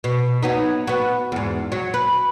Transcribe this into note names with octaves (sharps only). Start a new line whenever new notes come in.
B2
F#3 B3 D#4
B3 F#4
E2 G#2
F#3
B4